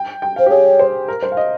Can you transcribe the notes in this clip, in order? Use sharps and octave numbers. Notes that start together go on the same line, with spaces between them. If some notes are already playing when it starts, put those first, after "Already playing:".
Already playing: G5
G5
C5 F5
G4
G#4 C#5
C5
A#4
C5
F5
D#5